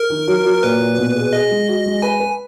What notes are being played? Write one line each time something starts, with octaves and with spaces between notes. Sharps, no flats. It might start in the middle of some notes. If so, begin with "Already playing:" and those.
Already playing: A#4
D#3
F#3
F#3
A#2 B4
A#2
B2
G#4
G#4 D#5
G#3
F#4
G#3
B4 G#5
B4